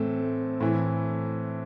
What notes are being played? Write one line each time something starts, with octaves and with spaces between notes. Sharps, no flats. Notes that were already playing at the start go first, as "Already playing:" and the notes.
Already playing: A2 E3 A3 C4
A2 E3